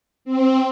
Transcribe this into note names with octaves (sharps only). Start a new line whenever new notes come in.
C4